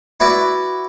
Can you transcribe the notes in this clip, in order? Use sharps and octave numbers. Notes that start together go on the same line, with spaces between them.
E4 F#4 B4 D5